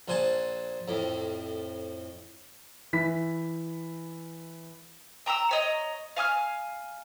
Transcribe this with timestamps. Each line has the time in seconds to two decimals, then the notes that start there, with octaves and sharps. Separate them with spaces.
0.08 A#1 C5 F#5 G#5 A5
0.88 F2 A2
2.93 E3 E4 B6
5.26 G5 A#5 D6 E6
5.51 C#5 D#5 A#5
6.17 F5 G#5 D#6 F6